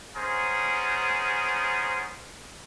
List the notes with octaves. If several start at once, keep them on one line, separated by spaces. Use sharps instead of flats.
B3 C#4 D#4 G#4 A#4 C5